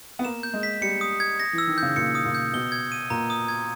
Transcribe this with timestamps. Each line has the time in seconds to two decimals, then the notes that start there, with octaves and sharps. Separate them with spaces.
0.19 B3
0.25 A#3 E7
0.43 G6
0.53 G#3
0.63 B6
0.82 G3 C#7
1.01 D#6
1.20 G#6
1.40 A#6
1.53 E3
1.58 E6
1.68 D#3
1.78 C#3 G6
1.96 A#2 C#7
2.15 D#6
2.25 A#2
2.35 G6
2.53 B2 G7
2.72 G#6
2.92 D#7
3.10 A#2 A#5
3.30 D#6
3.48 G#6